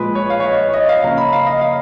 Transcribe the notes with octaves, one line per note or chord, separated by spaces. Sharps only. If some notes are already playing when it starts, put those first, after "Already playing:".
Already playing: A#2 F3 G#3 B4
C#5
F5
C#5
D#5
C#5
D#5
F5
C#3 F3 A#3 C#4 A#5
B5
F5
D#5
F5